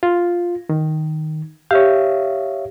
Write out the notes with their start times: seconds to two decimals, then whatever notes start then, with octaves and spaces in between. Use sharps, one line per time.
0.03 F4
0.69 D#3
1.71 G4 C#5 E5 F5